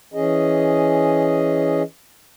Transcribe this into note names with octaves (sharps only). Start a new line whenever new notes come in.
E3 C#4 G#4 D#5